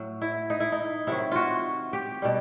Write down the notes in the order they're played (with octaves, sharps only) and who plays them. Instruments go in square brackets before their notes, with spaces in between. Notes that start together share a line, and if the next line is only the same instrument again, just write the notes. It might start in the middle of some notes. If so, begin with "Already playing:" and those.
Already playing: [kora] A2 F#3
E4
D#4
E4
D#4
C3 D#3 F#3 E4
F4 F#4
G4
B2 G3